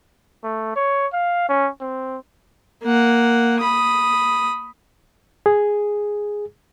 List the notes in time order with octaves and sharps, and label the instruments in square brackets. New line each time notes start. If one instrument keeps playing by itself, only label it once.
[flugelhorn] A3
C#5
F5
C#4
C4
[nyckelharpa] A#3 F#5
B5 D#6
[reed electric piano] G#4